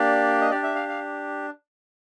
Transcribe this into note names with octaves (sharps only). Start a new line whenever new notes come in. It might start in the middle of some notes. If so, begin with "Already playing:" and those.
Already playing: A#3 D4 G4 D5
D#5
D4 G4 D5
E5
F5
F5